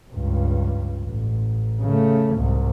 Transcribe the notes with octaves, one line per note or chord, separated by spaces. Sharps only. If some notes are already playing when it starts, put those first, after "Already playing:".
C#2 G2
A1
C#3 A3
C2 G#2